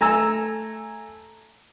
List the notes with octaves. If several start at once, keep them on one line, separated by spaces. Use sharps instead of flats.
A3 G#5 A#5 E6